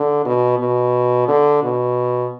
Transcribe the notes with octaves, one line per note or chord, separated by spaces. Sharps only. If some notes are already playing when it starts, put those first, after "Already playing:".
Already playing: D3
B2
B2
D3
B2